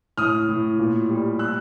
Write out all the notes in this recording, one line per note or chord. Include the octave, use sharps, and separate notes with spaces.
A2 D#6 F6
A2
A#2
G3
E6 F#6